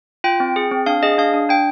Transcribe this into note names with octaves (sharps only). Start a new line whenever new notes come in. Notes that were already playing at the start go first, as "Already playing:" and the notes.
F4 G5
C4
G#4
C4
D4 F5
G#4 D#5
D4 F5
D4
D4 G5